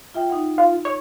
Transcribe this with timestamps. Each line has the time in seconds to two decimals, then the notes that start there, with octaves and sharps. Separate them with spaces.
0.15 F4 E5 G5
0.30 D#4 F#5
0.58 F4
0.85 C#5